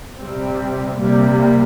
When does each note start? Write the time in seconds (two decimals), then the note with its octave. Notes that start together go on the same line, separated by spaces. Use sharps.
0.18 C3 G3 C4
0.99 C3 G3 A#3